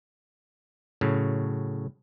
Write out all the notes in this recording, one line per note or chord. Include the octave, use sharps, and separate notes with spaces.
A2 C#3 F#3